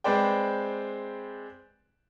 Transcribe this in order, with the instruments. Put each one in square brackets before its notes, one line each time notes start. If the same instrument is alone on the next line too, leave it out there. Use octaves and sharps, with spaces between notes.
[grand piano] G#3 C4 B4 C5 D5 G5